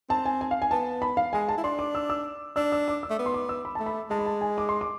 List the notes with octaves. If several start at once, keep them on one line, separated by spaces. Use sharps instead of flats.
C4 A5
G#5
G#5
F5
G#5
B3 A5
B5
F5
G#3 G#5
A5
E4
D4 C6
D6
E6
E6
D4 E6
E6
D6
E6
A3
B3
C6
D6
E6
B5
A3 A5
B5
G#3 A5
B5
A5
G#5
D6
C6
D6